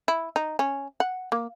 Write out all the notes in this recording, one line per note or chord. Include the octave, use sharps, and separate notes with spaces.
E4
D#4
C#4
F#5
A#3